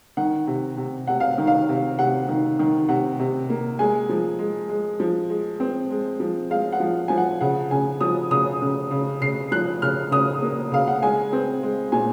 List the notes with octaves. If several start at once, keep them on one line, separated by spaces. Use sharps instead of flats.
D#3 F#5
C3
C3
C3 F#5
F5
D#3
F5
C3
C3 F#5
D#3
D#3
C3 F#5
C3
A#3
G#3 G#5
F3
G#3
G#3
F3
G#3
C4
G#3
F3
G#3 F5
F#5
F3
F3 G#5
F#5
C#3 F#5
C#3 G#5
F3 D#6
C#3 D#6
C#3
C#3
C#3 C7
F3 F#6
C#3 F6
C#3 D#6
A#3
C#3 F5
F#5
G#3 G#5
C4
G#3
A#2 G#5